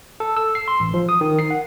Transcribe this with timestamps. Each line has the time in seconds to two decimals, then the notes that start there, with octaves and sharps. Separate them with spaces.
0.20 A4
0.36 E6
0.55 C7
0.68 C6
0.80 A1
0.94 F3
1.09 D#6
1.21 D#3
1.39 C7
1.50 F#5